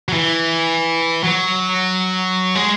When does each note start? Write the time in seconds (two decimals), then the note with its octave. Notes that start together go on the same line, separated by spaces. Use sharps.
0.09 F#3
0.13 E3
1.23 F#3
2.55 G#3